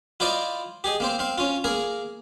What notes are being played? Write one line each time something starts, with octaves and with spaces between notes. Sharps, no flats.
E4 F4 C5 D5 D#5 A#5
G4 G#4 D#5
A#3 C4 C5
C4 F5
C#4 F4
A#3 G#4 A#4